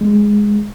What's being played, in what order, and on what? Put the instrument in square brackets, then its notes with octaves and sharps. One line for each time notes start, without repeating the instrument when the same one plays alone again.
[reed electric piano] G#3